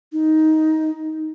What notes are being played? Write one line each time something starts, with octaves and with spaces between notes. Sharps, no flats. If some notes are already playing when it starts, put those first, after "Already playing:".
D#4